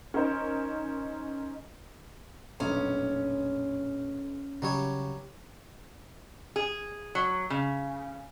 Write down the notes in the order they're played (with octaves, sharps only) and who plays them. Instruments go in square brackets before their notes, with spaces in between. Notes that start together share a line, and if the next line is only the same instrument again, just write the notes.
[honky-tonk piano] C#4 D#4 A#4 C5
[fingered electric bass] F1 A#2 D4 [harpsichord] B1 [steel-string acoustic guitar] C#4
[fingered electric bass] C#3 [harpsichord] F#3 G3 C#5
[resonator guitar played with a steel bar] G#4
F#3
C#3